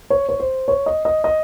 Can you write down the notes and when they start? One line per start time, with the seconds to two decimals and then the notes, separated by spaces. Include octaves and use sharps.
0.10 C#5
0.29 C#5
0.40 C5
0.68 C#5
0.86 D#5
1.05 D#5
1.24 D#5